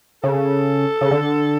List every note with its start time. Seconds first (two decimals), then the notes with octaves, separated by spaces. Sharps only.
0.23 C#3 A4
1.01 C#3
1.11 D3